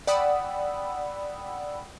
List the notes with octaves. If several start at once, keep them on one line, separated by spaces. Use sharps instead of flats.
D5 F#5 G5 B5 D#6 E6